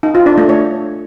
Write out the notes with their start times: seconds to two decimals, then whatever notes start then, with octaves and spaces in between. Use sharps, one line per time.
0.03 D#4
0.15 F4
0.26 D4
0.38 A3
0.49 C#5